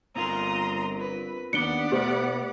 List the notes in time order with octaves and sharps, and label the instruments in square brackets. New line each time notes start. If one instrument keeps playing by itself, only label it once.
[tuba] G1 [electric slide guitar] C4 F4 A#4 [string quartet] A#5 C6 D#6
[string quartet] B4
[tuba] D#2 [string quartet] B3 D5 F#5 [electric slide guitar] D4 [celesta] C#7 D7 G7
[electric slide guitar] B2 E4 B4 [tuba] A3 [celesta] G4 C5